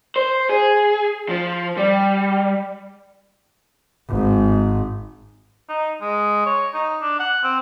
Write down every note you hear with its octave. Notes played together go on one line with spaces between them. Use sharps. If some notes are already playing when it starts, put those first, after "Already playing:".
C5
G#4
F3
G3
G#1 G#2
D#4
G#3
C#5
D#4
D4
F#5
C4